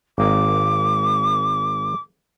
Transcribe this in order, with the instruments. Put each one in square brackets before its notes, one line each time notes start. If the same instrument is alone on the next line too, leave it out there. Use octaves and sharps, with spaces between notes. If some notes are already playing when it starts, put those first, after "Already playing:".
[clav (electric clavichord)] G#1 A#3 D#5 [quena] D6